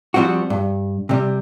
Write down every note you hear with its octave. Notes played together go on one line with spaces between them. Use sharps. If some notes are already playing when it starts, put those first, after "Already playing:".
F3 G3 C4 F4 F#4
G2
C3 G3